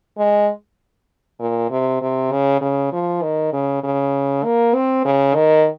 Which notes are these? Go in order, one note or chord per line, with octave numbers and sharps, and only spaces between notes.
G#3
A#2
C3
C3
C#3
C#3
F3
D#3
C#3
C#3
A#3
C4
C#3
D#3